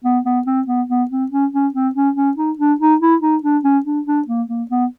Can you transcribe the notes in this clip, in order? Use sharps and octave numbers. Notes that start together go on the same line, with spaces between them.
B3
B3
C4
B3
B3
C4
C#4
C#4
C4
C#4
C#4
D#4
D4
D#4
E4
D#4
D4
C#4
D4
D4
A#3
A#3
B3